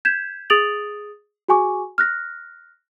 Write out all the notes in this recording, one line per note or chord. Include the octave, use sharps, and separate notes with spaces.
G6 G#6 B6 E7
G#4 D#6 A6 D7 F7 F#7
F#4 G#4 G#5 C#6 D6
F6 F#6 A#6